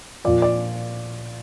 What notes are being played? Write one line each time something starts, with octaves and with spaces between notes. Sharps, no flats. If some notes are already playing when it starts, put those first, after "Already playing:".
A#2 F3 D5
D5